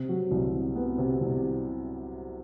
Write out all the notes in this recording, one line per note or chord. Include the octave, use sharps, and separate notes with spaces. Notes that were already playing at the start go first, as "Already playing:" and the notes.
Already playing: C3
F#3
C2
C3
B3
C3
C2